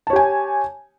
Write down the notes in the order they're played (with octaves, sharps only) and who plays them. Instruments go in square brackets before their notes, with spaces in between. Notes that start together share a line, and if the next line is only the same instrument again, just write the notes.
[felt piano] A5
C#5
G4
G#5